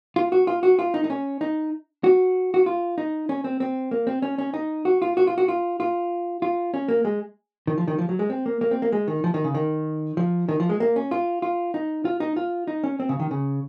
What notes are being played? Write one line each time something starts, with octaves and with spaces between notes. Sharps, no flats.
F4
F#4
F4
F#4
F4
D#4
D#4
C#4
D#4
F#4
F#4
F4
D#4
C#4
C4
C4
A#3
C4
C#4
C#4
D#4
F#4
F4
F#4
F4
F#4
F4
F4
F4
C#4
A#3
G#3
D#3
F3
D#3
F3
F#3
G#3
C4
A#3
A#3
C4
A#3
G#3
D#3
F3
D#3
C#3
D#3
F3
D#3
F3
G#3
A#3
C#4
F4
F4
D#4
F4
D#4
F4
D#4
C#4
C4
C#3
D#3
C#3